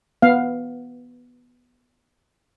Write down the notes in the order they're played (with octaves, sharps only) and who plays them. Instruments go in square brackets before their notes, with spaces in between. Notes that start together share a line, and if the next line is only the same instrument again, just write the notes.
[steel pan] B3 F5